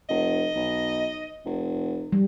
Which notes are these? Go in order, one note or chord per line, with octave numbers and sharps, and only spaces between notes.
F1 D#5
B1
F1
G3